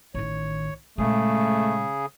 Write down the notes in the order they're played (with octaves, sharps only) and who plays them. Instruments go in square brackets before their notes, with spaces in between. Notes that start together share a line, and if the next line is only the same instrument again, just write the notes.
[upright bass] A1 D#3 [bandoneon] C#5
[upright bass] A#2 G#3 [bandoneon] C#3 G#4 [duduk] A3